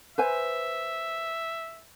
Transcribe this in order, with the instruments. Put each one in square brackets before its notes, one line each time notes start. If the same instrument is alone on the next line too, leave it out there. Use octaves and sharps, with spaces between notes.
[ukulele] B4 C5 G#5 [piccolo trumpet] E5